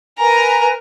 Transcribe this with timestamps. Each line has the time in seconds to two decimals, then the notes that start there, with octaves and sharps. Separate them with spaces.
0.19 A#4 B4 G#5 A#5